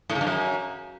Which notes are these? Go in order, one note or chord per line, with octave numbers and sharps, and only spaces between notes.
A2
C#3
G2
F#2